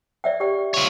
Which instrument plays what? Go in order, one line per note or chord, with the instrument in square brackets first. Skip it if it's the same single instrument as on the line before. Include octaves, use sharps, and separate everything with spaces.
[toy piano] D5 E5 G5
G4 D5 G5
[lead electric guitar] F4 C#5